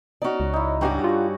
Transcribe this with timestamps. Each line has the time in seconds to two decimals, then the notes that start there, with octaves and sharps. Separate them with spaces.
0.22 C#4 D#4 F#4 D5
0.40 C#2
0.53 D#4 E4
0.81 G2 G3 C#4 F#4 G4 A#5
1.04 F4